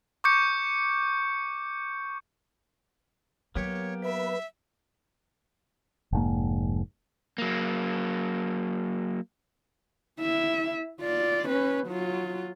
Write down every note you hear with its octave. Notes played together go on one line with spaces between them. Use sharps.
C#6 D6 G6 C#7
F#3 A#3 B3 G4 C#5
B4 E5
F1 G#2 A#3
F#3 A#3
E4 E5
F4 D5
C#4 B4
F#3 F4